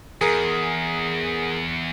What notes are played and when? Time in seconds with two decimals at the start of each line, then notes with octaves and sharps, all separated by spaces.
0.21 E2 G#4 A#4